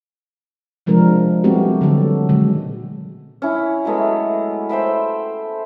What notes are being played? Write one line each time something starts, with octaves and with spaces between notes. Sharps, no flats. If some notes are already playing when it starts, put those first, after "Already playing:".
C3 F3 G#3 D4 A#4
G3 A3 B3 C4 F#4 G4
D3 F#3 F#4 A4
A#2 D3 D#3 F#3 G#3
C#4 E4
F#3 G#3 A3 B3
C5 E5 G5 B5